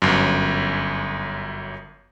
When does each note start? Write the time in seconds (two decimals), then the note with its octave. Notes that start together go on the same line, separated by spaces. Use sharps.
0.02 G1 F#2